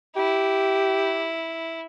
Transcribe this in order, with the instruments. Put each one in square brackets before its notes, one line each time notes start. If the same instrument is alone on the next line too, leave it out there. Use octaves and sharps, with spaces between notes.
[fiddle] E4 [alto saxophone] G4